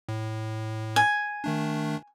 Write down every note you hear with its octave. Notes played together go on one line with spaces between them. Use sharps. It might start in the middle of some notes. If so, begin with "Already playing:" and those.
A2
G#5
D#3 A3 D4